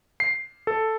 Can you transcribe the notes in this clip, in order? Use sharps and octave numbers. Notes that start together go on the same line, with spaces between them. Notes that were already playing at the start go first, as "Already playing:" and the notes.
C7
A4